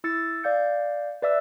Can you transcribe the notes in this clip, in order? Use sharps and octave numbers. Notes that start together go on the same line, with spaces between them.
E4 E6 A6 C#7
D5 F5 G6 C#7
B4 D5 E5 E6